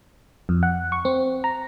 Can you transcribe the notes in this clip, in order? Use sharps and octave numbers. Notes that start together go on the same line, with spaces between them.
F2
F#5
C#6
C4
A#5